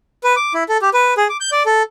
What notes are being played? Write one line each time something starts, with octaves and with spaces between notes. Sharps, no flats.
B4
D6
E4
A4
G4
B4
G#4
D6
G6
D5
A4